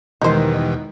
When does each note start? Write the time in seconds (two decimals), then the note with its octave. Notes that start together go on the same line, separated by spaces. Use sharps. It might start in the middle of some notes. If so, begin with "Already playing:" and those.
0.22 E2 B2 D#3 G3 G#3 D#4 C5